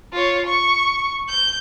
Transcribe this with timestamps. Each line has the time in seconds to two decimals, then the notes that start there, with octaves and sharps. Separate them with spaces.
0.13 F4 C#5
0.46 C#6
1.29 G6